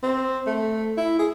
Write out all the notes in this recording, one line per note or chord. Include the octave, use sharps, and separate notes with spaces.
C4
A3
E4
G#4